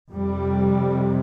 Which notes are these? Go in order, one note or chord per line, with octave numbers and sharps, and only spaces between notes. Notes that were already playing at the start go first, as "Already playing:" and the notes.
F2 C3 G3